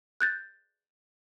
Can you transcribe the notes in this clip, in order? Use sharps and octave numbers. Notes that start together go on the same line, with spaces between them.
F#6 G6 A6